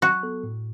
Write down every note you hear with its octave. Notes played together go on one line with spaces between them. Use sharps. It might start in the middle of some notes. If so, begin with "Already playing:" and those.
F#3 F#4
B3 A4
A2